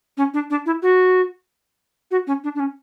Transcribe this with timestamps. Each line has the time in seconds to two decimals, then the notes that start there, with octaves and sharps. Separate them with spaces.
0.17 C#4
0.33 D4
0.50 D4
0.65 E4
0.82 F#4
2.11 F#4
2.27 C#4
2.43 D4
2.55 D4
2.59 C#4